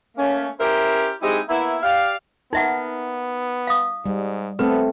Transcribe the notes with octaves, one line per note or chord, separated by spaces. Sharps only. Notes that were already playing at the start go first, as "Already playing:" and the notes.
A3 A#3 C#4
C#4 E4 G4 A#4 C5
G#3 C4 D#4 E4 G4
A#3 B3 E4
G4 D5 F5
B3 D#4 A#4 E5 F#5
F5 D#6
G#2 G3
A3 B3 C4 A4 B4